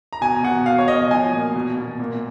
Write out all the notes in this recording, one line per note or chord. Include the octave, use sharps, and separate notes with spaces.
A#5
B2 G#5
B2 F#5
B2 F5
C#5
B2 D#5
F3 G#5
A#2
B2
B2
A#2